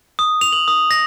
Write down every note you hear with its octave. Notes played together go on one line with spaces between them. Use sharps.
D#6
F7
F#7
D#6
A#6